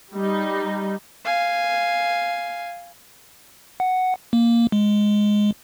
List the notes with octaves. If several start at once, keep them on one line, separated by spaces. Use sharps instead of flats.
G3 D#4
F5 G#5
F#5
A#3
G#3